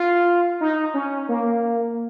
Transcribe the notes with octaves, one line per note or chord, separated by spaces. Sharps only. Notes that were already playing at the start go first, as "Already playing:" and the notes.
Already playing: F4
D#4
C#4
A#3